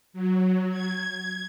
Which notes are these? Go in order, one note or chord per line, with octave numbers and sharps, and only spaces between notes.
F#3
G#6